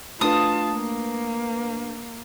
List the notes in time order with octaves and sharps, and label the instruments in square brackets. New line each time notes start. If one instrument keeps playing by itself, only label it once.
[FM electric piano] A3 D4 B4 [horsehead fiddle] F4 A5 [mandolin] D#6
[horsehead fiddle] A#3